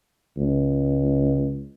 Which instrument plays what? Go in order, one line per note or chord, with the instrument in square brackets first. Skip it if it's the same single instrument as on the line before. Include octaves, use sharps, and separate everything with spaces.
[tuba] C#2